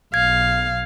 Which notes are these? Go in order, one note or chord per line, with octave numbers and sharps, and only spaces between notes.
B1 F5 G#6